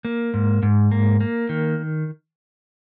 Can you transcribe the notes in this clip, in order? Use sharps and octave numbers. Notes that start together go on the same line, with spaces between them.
A#3
G#2
G#2
A#3
A#3
D#3